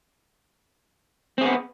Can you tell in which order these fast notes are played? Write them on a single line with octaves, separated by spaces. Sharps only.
C4 G#4 B3